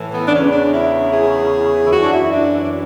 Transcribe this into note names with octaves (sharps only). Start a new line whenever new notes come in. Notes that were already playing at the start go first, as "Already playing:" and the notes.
Already playing: A2 E3
B3
D4
E2 C#3 E3 C#4
D4
E4
G#4
E4
F#2 E3 F#4
D4
E4
D4
D4